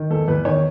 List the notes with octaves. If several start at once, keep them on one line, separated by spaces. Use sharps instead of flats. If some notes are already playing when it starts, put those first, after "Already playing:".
Already playing: D#3
E2 A4
E2 B4
D#3 C#5